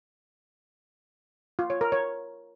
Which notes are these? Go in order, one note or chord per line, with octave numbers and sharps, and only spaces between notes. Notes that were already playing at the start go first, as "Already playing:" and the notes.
F4
C#5
A#4
C#5